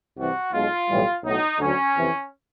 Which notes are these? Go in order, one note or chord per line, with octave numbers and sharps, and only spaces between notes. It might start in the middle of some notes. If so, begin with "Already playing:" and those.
C2 C3 E3 G3 F#4
B1 B2 G#3 F4
B1 A2 E3 G3
B1 A2 F#3 D#4
D2 D3 F#3 C#4
F2 C3 E3